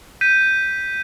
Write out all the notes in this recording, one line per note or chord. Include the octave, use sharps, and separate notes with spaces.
G6 B6 D#7